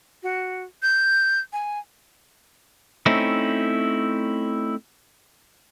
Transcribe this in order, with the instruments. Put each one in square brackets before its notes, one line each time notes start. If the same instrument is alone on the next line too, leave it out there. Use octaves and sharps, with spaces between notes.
[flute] F#4
G6
G#5
[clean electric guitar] A3 C4 C#4 D#4 E4